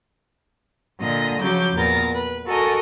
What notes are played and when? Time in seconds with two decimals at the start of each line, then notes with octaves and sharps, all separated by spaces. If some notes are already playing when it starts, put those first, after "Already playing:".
1.00 A#2 D3 D#5 A#5
1.41 C#3 F3 F#3 D6 G6
1.74 E2 A#2 B3 A#4 A6 A#6
2.15 B4
2.46 F#4 A4 A#4 D#5 G#5